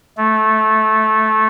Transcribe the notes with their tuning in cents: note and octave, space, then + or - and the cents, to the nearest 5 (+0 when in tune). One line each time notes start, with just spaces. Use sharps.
A3 -15